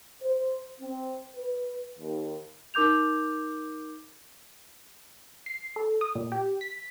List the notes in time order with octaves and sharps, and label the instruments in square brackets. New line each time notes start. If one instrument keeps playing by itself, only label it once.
[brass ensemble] C5
C4
B4
D#2
[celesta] D#4 A#4 D6 G6 F7
[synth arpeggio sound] C7
A4
D#6
A#2
G4
B6